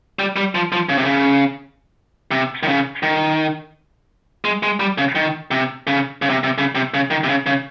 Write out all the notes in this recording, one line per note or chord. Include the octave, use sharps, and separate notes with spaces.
G3
G3
F3
F3
C#3
C3
C#3
C3
D#3
C#3
D#3
G#3
G#3
G3
C#3
D#3
C3
C#3
C#3
C3
C3
C#3
C3
C#3
D#3
C3
C#3
C#3